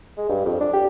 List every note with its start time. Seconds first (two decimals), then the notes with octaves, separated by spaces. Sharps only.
0.17 G#3
0.29 G2
0.45 F2
0.60 D4
0.73 G4